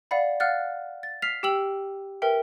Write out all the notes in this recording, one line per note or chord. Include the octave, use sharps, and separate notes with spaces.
D5 F5 F#5 B5
F5 F#5 F6 F#6 A6
A6
F6 B6 C7 F7
G4 G5 E6 F#7
A#4 B4 E5 G5